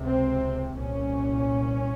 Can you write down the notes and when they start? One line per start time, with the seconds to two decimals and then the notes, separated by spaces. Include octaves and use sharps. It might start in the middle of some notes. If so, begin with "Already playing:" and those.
Already playing: C#2 C3
0.08 C4
0.76 C2 A#2 C#4